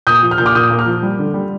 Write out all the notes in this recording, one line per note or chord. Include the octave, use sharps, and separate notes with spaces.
A#2 D#6 G6
F3
F6
A#2 G6
D6 F6
A#2 D#6 G6
A#3
D6 F6
F3
G3
D3
G3